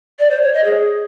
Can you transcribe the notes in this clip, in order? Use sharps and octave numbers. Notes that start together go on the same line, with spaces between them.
D5
C5
C#5
D#5
G#4